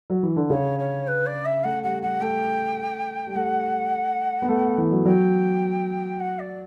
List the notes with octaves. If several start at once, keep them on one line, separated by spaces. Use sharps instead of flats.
F#3
E3
D3
C#3 C#5
C#5
B4
D5
E5
A3 F#5
G3 F#5
G3 F#5
A3 G5
G3
A3 F#5
B3
A3
E3
F#3
F#3 G5
F#5
D5